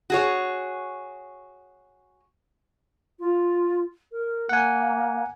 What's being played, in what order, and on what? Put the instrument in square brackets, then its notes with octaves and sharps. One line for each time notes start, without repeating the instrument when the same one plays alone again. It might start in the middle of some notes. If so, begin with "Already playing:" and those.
[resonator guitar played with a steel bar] F#4 G#4 C#5
[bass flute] F4
A#4
[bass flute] A#3 [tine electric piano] F#5 G#5